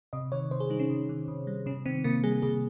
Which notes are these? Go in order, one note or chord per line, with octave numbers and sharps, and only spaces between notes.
C3 D#5
D#3 C#5
C3 C5
G#4
G3 D#4
C#4
C3
D#3
C3
G3
C3 C#4
D#3 C4
C3 A#3
G3 G#4
C3 G#4